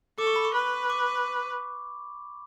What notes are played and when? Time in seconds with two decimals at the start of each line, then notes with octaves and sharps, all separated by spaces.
0.18 A4 D6
0.27 C#6
0.36 B5
0.45 C#6
0.54 B4
0.90 D6